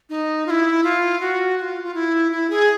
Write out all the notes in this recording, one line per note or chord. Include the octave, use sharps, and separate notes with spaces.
D#4
F4
E4
F4
F#4
F#4
F4
F4
E4
E4
G#4